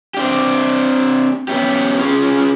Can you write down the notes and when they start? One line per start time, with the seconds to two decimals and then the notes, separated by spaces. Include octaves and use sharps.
0.14 C4 D4 G4
1.48 B3 C#4 G4
1.98 C#4 F4 G#4